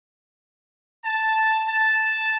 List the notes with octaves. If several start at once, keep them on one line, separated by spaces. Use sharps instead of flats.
A5
A5